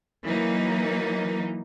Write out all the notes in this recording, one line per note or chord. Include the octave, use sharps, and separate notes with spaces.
E3 F#3 A#3 D#4